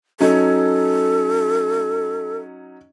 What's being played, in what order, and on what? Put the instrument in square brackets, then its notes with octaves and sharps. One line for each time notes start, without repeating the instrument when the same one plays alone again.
[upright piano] F#3 C#4 D#4 [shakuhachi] A4